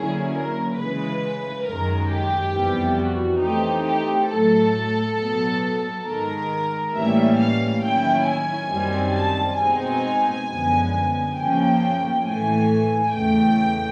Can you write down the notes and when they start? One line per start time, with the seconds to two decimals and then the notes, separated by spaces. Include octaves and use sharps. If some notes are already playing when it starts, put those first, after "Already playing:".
Already playing: D3 F#3 A#3 C#4 E4 G#4
0.32 A#4
0.75 C#3 E3 G#3 B4
1.64 F#2 D#3 G#3 A#4
2.09 G4
2.53 F2 C3 E3 G3 B3
2.97 F#4
3.41 E3 A3 C4 D#4 G4
3.86 G4
4.29 A2 F#3 A3 A4
5.17 B2 F#3 B3
6.06 G#2 D#3 G#3 A#4
6.94 A2 E3 G3 A#3 C#4 E5
7.39 F5
7.82 D#3 F#3 A#3 C#4 E4 G5
8.27 G#5
8.71 F#2 D#3 G3 C4
9.15 A5
9.59 B2 G#3 C4 D#4 G#5
10.48 F#2 D3 F3 G#3 B3
11.36 C#3 F3 A#3 G5
12.24 A2 E3 A3 G#5
13.12 E2 C#3 E3 A3 G5